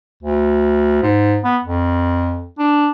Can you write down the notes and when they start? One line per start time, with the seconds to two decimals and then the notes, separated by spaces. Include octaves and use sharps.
0.23 D2
1.03 G#2
1.44 B3
1.64 F2
2.59 D4